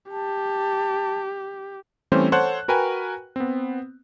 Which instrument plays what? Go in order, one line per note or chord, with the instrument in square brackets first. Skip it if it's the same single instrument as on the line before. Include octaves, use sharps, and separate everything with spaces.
[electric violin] G4 [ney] A5
[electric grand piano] E3 G3 A3 C4 C#4 C5
A4 C5 C#5 F#5 A5 F#6
F#4 A#4 B4 G5 G#5
B3 C4